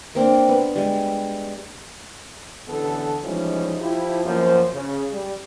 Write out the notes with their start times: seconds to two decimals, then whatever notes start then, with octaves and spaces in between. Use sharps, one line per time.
0.15 A#3 C4 D4
0.49 B3
0.75 G3 G#3
2.68 A1 D3 E3 B3 A4
3.23 E3 F3 G3 G#3 C#4 D#4
3.81 F3 E4 G4
4.25 F#2 F3 A#3 B3 C5
4.73 C#3
5.12 G3